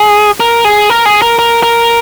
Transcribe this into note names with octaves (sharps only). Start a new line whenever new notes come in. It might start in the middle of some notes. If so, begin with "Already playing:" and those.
Already playing: G#4
A#4
G#4
A#4
G#4
A#4
A#4
A#4